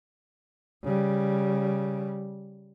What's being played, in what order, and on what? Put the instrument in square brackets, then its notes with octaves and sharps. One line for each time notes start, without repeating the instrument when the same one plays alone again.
[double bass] C#3 G3